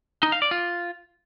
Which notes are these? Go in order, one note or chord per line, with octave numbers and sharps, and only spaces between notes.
D#4
F5
D5
F4